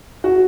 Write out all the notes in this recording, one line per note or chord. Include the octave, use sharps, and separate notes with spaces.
F#4